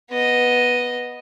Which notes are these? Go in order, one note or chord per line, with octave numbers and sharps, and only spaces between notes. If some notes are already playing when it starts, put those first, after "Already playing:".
B3 D#5